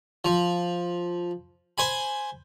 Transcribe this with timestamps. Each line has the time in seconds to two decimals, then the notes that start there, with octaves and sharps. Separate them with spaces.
0.25 F3
1.78 C5 G#5 B5